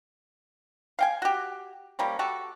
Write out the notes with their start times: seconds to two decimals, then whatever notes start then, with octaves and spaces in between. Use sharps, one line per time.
0.99 F5 G5 G#5
1.22 F#4 G4
1.99 F3 G3 A#3 C#4
2.19 F#4 G4 A4